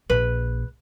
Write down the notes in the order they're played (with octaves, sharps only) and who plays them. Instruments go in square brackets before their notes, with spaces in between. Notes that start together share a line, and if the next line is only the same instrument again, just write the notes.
[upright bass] A#1 [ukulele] B4